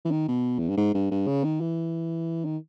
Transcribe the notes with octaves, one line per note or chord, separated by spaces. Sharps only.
E3
D#3
B2
E2
G2
G#2
G2
G2
C#3
D#3
E3
D#3